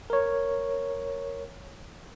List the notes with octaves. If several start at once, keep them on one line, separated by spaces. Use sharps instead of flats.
A#4 C#5